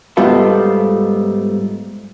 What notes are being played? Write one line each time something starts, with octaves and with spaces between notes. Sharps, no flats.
G#2 G3 A3 B3 F4 A4